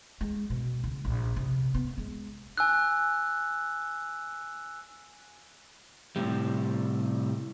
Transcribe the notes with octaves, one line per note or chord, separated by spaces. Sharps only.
G#3
B2
C#2
A#1
C3
B3
G#3
G#5 E6 F#6
A2 C3 G3